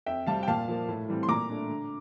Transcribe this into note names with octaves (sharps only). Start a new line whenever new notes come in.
F2 E5 G5
C3 G3 C4 F5 A5
G5
A#2 F5 A5
F3 A#3
A2
E3 G3 C4
C6
A#2 A#5 D6
A3 D4
D3